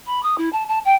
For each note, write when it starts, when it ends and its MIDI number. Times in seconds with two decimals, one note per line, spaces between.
0.06 0.21 83
0.22 0.37 87
0.38 0.49 64
0.52 0.63 81
0.68 0.79 81
0.84 0.95 79